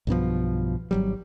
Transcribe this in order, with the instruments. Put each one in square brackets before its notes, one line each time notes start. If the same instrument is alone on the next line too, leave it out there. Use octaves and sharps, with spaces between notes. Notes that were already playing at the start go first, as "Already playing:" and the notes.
[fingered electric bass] B1 G2 B2 F3
G#1 F#3 G3